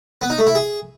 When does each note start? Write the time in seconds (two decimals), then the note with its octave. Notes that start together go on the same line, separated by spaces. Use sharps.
0.21 B3
0.30 D#4
0.38 A3
0.47 E4
0.55 G#4